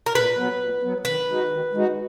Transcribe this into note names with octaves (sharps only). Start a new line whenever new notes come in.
A#4
A#2 B4
F#3 B3
A#2
F#3 B3
D#3 B4
G#3 D#4 F#4
D#3
G#3 D#4 F#4